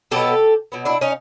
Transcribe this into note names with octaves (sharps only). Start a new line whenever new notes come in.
B2 F#3 B3 G4 A4
B2 F#3 B3
D4 E4
C#4 D#4